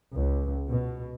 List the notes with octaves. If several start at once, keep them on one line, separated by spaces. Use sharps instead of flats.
C#2
B2